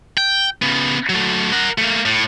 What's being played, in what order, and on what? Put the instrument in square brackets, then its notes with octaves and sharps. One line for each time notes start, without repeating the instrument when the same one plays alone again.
[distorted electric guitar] G5
C#3 B3
F#3 A3
A#4 F#5
A3 A#3
A2